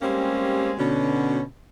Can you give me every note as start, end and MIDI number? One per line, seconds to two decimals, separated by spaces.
0.02 0.72 55
0.02 0.72 56
0.02 0.72 58
0.02 0.72 60
0.02 0.72 61
0.02 0.72 67
0.78 1.41 47
0.78 1.41 50
0.78 1.41 61